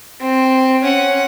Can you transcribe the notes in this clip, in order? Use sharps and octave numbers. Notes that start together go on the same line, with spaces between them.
C4
C#4 F#5